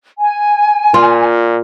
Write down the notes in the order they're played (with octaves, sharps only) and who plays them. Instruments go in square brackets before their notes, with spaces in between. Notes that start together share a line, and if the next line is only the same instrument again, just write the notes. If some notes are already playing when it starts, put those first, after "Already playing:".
[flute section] G#5
[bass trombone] A#2 [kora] F4